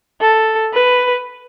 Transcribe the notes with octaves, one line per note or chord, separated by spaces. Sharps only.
A4
B4